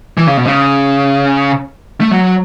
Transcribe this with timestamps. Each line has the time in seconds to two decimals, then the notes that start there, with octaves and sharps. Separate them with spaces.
0.17 E3
0.27 C#3
0.37 B2
0.46 C#3
2.01 A3
2.11 F#3